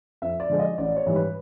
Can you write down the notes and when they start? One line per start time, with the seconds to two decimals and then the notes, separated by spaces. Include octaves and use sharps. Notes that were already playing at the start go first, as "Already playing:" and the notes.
0.22 F2 E5
0.40 D5
0.50 D3 F3 G#3
0.60 D#5
0.78 A1 D5
0.96 C#5
1.06 G#2 E3 G3
1.16 B4